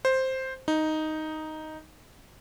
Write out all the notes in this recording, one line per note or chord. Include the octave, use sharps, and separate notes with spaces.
C5
D#4